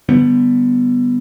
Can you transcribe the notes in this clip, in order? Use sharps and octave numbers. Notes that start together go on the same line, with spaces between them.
D3 G3 B3